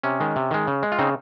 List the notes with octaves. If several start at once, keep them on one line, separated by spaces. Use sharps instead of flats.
C3 C#4
D#3 G#3
C3
D#3 G#3
C#3
G#3
F4
C#3 C4 D#4